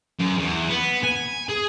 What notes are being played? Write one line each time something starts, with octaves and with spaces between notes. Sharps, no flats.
F#2
E2
B3
G#5
G#4